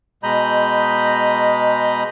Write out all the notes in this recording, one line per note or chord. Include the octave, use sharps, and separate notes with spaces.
B2 G#3 D#5 A#5 B5 G6